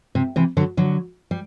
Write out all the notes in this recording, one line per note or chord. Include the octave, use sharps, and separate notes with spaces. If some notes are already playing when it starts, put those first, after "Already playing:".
C3
C3 E3
D3 F#3
D3 F#3
G3